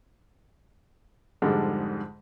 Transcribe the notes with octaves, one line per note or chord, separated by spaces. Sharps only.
F2 G#2 D3 G3 G#3